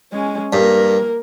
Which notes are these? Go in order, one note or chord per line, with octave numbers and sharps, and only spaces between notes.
G#3 C#4
G2 A#3 A#4